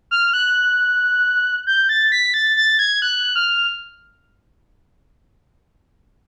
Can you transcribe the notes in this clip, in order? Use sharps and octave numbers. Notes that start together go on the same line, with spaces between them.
F6
F#6
G6
A6
B6
A6
A6
G#6
F#6
F6